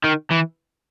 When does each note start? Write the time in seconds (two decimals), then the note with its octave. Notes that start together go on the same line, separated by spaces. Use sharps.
0.04 D#3
0.31 E3